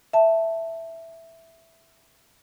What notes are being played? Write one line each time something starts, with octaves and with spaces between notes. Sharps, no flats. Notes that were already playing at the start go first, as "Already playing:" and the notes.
E5 A5